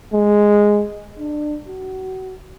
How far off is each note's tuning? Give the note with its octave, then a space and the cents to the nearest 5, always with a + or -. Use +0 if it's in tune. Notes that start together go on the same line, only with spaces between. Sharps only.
G#3 -5
D4 +25
F#4 +25